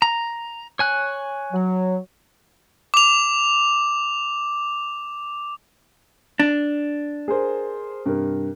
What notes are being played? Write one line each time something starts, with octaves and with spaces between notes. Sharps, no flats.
A#5
C#5 G#5 F#6
F#3
D6 F7
D4
G#4 A#4 C5
G2 C3 A#4